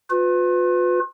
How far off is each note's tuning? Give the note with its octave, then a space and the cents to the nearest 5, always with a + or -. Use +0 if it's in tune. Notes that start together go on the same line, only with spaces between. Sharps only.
F4 +40 B4 +20